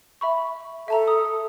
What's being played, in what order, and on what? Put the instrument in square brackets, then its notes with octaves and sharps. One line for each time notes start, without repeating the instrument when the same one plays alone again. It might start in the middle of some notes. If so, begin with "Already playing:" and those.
[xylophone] E5 B5 C#6
[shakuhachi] A4 [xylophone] E5 A5 A#5
[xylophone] D#6